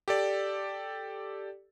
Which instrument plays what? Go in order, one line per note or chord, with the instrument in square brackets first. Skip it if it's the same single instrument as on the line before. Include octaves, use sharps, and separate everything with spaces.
[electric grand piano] G4 A4 D5